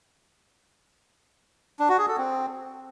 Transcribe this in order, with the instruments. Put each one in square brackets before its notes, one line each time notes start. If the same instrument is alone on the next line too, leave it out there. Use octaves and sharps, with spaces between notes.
[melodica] D4
F#4
G#4
A4
C4